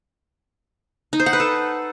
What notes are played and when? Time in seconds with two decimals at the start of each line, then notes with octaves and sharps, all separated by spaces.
1.13 D#4
1.20 C5
1.26 F#5
1.33 B4
1.40 A4